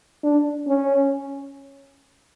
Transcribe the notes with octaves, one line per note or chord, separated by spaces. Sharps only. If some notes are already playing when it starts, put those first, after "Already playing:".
D4
C#4